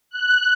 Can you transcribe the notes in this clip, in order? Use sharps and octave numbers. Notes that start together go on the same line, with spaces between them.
F#6